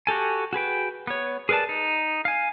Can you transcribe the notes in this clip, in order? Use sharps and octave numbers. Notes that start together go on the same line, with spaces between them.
F#4 G4 A4 G#5
F#4 G#4 B4 G5
B3 C#5
G#4 A#4 B4 D5 A5
D#4
F5 G#5